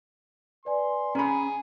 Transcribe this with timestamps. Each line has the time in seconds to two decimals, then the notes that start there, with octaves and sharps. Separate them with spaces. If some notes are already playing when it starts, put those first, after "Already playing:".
0.65 B4 D5 G#5 C6
1.15 C#4 G#4 A#5 B5